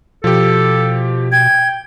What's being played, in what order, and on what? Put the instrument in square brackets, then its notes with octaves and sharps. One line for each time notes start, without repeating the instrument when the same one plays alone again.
[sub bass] B2 [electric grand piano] F3 G4 [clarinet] A4
[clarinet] G5 [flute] G#6